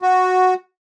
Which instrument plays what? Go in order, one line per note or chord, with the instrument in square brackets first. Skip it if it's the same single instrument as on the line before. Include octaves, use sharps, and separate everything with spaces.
[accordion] F#4